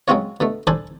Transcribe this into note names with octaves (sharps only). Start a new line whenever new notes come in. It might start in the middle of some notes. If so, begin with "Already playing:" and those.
F#3 G#3 C4 C#4 F4 C#5
B2 D3 A3
D4 A4 C5 G#5 A5 B5